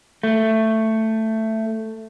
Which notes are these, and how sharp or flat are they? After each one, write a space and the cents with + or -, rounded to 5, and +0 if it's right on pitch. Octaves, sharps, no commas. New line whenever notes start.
A3 +10